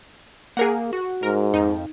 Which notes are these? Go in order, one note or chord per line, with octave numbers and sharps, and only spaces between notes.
A#3 G#4 A#4 F#5
F#4
G#2 A#4
F2 D#4